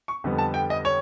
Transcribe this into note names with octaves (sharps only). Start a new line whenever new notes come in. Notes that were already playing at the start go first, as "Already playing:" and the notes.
C#6
F2 D3 G3 B3
A5
G5
D#5
C#5